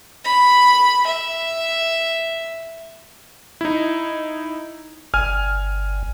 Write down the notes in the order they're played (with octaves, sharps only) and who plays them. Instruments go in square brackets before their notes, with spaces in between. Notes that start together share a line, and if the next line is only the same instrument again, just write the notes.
[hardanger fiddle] B5
E5
[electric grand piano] D#4 E4
[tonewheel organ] G1 [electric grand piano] G#5 F6